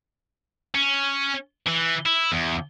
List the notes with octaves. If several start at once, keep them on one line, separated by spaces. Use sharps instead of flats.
C#4
E3
E4
E2